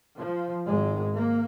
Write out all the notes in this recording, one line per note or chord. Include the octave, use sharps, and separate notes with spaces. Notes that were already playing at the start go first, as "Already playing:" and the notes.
F3
G#1 G#2 G#3
A#3